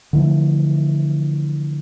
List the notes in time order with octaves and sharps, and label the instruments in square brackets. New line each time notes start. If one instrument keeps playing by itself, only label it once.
[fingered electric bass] D3 E3 F3 A3